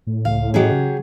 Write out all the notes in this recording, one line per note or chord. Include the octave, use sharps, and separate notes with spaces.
A2
C#2 F5
F#3 C#4 G4 G#4 D#5
C#3